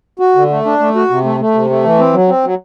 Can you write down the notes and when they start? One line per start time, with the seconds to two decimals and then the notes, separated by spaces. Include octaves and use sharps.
0.19 F#4
0.35 D3
0.50 A3
0.65 D4
0.79 A3
0.95 F#4
1.10 C3
1.24 A3
1.40 A3
1.54 C3
1.70 A3
1.84 E3
1.99 C4
2.13 F#3
2.28 C4
2.44 F#3